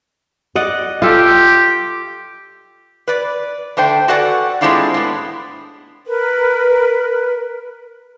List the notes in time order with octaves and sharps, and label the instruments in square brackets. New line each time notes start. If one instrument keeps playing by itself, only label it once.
[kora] D5 D#5 F#5
[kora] F4 A4 [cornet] G4
[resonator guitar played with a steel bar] B4 D5
D3 A3 C5 G5
F#4 A4 B4 D5 F#5 G#5
G#3 A3 C4 D4 E4 F4
A2 B3
[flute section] A#4 B4